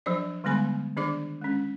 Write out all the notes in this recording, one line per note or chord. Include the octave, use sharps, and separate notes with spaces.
F3 F#3 D4 C5 D5
D3 G3 G#3 B3 G#5 B5
D#3 D4 G#4 D5 D6
G#3 C#4